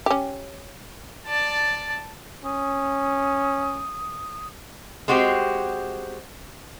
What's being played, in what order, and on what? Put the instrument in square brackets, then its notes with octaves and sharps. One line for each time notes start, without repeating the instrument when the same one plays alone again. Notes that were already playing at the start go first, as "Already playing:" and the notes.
[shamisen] C#4 G4
[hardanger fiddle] D5 A5
[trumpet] C#4 [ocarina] D#6
[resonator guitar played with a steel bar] G#3 C4 F#4 G4